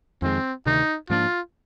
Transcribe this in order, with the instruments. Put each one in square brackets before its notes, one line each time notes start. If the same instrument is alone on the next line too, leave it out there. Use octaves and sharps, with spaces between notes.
[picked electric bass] F2 D#3 G#3 [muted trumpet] C4
[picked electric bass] D2 C3 D#3 [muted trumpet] D#4
[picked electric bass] G#2 F3 A#3 D4 [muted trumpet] F4